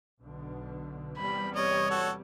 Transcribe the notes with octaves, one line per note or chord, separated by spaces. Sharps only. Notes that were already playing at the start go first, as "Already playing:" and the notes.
B1 B2 D3
E2 C3 G3 B5
C#5 D#5
F#4 A4